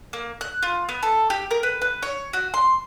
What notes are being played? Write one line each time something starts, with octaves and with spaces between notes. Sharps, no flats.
A#3
F#6
F4
B3
A4
G4
A#4
B4
B4
C#5
F#4
C6